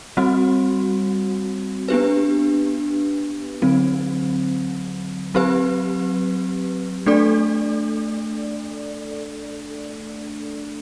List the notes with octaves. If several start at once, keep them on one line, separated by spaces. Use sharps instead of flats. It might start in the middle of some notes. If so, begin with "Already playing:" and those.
G3 C4 F#4
B3 D4 G4 B4
D3 F#3 C4
F#3 C4 G4 B4
A3 D4 A4 D5